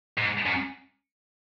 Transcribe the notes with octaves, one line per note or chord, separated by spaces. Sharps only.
G#2
F#2